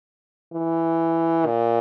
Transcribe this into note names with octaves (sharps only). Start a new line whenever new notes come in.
E3
A#2